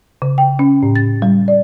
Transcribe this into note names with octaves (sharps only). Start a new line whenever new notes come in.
C#3
G5
C#4
A2
A6
G3
D5